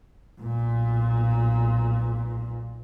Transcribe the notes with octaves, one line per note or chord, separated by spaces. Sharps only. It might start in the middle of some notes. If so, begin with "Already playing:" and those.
B1 A#2